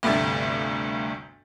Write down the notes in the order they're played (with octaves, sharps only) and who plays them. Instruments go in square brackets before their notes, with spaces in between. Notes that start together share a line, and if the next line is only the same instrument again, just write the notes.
[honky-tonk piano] G1 D2 C3 A3 A6